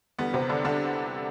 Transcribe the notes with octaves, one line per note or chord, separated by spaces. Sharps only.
E2 D3 G3 B3
C3 C4
D3 D4
D3 D4